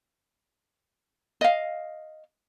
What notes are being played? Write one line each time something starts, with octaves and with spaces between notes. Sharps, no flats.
D#5 F5